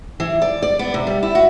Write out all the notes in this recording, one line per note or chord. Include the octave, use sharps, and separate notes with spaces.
E3
D5
D5
B3
C3
G3
E4
F#4